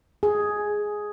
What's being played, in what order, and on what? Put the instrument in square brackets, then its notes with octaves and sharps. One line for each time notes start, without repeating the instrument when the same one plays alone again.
[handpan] G#4